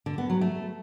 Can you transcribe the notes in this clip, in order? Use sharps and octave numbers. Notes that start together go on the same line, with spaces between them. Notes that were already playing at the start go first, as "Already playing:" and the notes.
D3
B3
F#3
A3